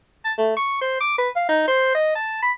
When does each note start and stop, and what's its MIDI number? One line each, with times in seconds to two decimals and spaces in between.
0.25 0.33 81
0.38 0.55 57
0.57 0.80 85
0.81 1.00 72
1.00 1.18 86
1.18 1.29 71
1.36 1.48 77
1.49 1.64 63
1.68 1.93 72
1.95 2.13 75
2.15 2.38 81
2.42 2.52 83